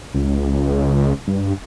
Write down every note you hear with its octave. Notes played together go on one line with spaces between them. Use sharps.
C#2
G2